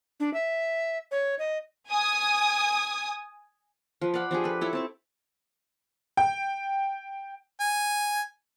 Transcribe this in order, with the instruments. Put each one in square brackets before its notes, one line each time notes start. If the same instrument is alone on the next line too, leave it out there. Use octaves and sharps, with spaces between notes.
[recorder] D4
E5
C#5
D#5
[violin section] G#5 D#6
[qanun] F3 B4
D5 F5 F#5 B5
F3 D4 G4 G#4
A4 B4
E4 A4 C#5
C4 A5 C#6
[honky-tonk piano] G5
[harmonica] G#5